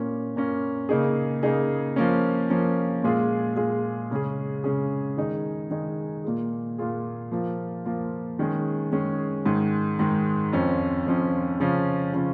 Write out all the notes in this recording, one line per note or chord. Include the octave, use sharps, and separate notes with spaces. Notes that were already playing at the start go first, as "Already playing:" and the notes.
Already playing: A#2 A#3 C#4
A#2 A#3 C#4
C#3 A#3 D#4 G#4
C#3 A#3 D#4 G#4
F3 A#3 C#4
F3 A#3 C#4
A#2 G#3 F4 G#4
A#2 G#3 F4 G#4
C#3 G#3 C#4 G#4
C#3 G#3 C#4 G#4
D#3 G#3 D#4 G#4
D#3 G#3 D#4 G#4
A#2 A#3 F4 G#4
A#2 A#3 F4 G#4
F3 A#3 F4
F3 A#3 F4
D#3 G#3 C#4 G#4
D#3 G#3 C#4 G#4
G#2 D#3 G#3
G#2 D#3 G#3
F2 F3 C#4
F2 F3 C#4
C#3 F3 C#4 F4
C#3 F3 C#4 F4